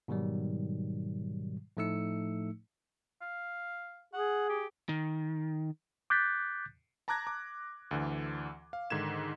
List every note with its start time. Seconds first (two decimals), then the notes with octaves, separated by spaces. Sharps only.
0.08 G#2 B2 D#3 F#3 G3
1.77 A2 F3 A3 D#4 E6 C#7
3.21 F5
4.14 G#4 F#5
4.50 G4
4.89 D#3
6.10 D6 F#6 G6 A6 B6
7.08 A5 A#5 D6 F#6 G#6 A#6
7.27 D6
7.91 D2 D3 E3
8.73 F5
8.90 G#2 D3 D#3 G#6 E7